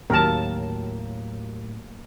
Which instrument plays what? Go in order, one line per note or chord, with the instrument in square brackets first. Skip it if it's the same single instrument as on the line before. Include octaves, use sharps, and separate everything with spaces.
[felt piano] D#2 [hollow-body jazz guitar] A2 [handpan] F#3 A#3 [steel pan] A#4 A5